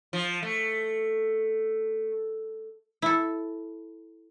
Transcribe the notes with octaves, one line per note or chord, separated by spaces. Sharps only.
F3
A3
E4 A4